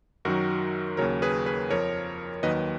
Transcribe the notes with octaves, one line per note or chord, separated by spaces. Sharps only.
F#2 D#3 F#3 F#4 A#4
D#2 C#3 F#3 A#4 C#5
G#4 B4
G#4 B4
F2 F3 A#4 C#5
D#2 D#3 F#3 B4 D#5